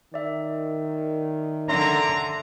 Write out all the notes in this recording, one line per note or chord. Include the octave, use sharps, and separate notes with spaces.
D#3 D5 E5
D3 E5 A#5 C6